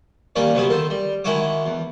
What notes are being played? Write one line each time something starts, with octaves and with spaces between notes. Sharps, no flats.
D#2 G3 A#3 C#4 C#5 D5
C3 F#3 B3 C4 G#4
D#3 A4 C5
G3
D#3 G#3 E4 F#4 C#5 D6
E2